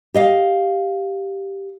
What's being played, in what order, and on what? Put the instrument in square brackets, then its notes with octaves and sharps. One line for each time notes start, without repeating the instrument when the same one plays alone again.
[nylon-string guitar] G4 D#5 F5